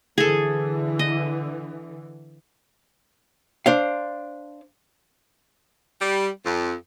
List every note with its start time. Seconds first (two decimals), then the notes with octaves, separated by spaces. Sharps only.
0.18 D3 E3 G#4 A4
0.99 D#5
3.66 D4 C5 F5
6.00 G3
6.44 F2